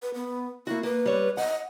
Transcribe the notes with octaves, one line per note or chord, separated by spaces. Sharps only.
B4
B3
A#3 E4 F#4
A#3 B4
G3 C#5
D#5 F#5